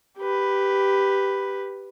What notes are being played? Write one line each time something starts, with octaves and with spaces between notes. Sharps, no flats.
G4 B4